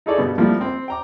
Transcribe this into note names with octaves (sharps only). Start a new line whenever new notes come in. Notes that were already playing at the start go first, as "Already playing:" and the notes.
D#4 E4 G#4 A4 C#5 D5
G2 B2 G3
F3 G3 A3 A#3 C4 E4
C4 C5
G5 A#5 D6